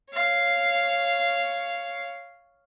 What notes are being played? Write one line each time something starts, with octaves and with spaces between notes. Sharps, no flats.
C#5 F5